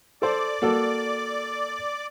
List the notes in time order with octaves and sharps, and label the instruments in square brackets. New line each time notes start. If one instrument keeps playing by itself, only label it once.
[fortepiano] A4 C5 [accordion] D5 D6
[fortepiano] A#3 F#4 A4